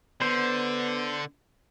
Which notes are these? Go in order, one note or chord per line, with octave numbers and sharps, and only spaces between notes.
D3 B3 C5